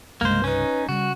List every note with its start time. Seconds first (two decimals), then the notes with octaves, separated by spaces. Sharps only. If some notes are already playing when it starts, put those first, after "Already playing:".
0.21 C2 G2 C#3 G#3 A#3 C5
0.44 C#4 D#4 B4
0.89 C#3 G3 F#4